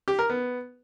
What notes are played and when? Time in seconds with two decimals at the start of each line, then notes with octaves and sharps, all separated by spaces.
0.08 G4
0.19 A#4
0.30 B3